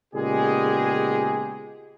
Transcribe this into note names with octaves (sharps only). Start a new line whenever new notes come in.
A#2 C#3 G#3 B3 G4 G#4